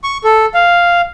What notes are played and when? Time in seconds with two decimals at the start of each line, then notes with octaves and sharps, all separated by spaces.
0.04 C#6
0.24 A4
0.54 F5